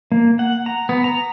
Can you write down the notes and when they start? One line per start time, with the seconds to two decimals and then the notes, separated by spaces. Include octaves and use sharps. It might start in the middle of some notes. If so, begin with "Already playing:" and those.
0.12 A#3
0.39 F#5
0.66 A#5
0.89 B3
1.04 A#5